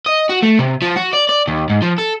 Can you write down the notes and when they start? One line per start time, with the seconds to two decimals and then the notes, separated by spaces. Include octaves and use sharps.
0.06 D#5
0.30 F#4
0.43 A3
0.59 C3
0.82 F3
0.96 F#4
1.13 D5
1.29 D5
1.48 D#2
1.70 G#2
1.82 F3
1.99 A4